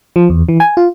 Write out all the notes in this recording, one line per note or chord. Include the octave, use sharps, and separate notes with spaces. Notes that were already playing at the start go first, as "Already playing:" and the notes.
F3
E2
E3
G#5
F4